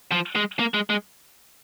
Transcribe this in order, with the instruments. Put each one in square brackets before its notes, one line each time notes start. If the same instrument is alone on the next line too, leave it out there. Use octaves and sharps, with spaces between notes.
[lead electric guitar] F3
G#3
A#3
G#3
G#3